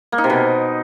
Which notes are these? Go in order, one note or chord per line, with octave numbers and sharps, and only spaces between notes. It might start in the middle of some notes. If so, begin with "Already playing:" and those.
A#3
D#4
C3
B2